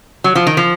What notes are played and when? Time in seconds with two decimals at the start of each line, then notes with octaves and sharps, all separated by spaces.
0.24 F#3
0.35 F3
0.47 D#3
0.57 F3